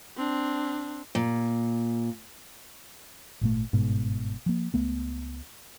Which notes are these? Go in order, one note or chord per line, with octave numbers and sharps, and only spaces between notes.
C4 D4
A#2
G#1 A#2 A3
G1 G#2 B2
F3 A#3
C#2 A3 B3